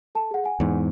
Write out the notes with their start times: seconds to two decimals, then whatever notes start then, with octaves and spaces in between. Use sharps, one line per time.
0.15 A4 A5
0.31 G#4 F#5
0.44 F#5 G#5
0.60 E2 G#2